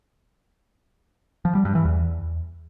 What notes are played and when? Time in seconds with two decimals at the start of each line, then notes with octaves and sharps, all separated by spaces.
1.45 F3
1.55 G3
1.65 G2
1.75 E3
1.85 E2